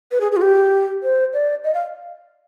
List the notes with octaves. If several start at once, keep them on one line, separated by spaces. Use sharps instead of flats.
B4
G#4
G#4
F4
G4
C5
D5
D#5
F5